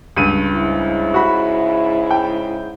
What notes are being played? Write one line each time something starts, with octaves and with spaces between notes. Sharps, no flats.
C#2 G2 D#7
G#2 C#3 E4
F#4 B5
G5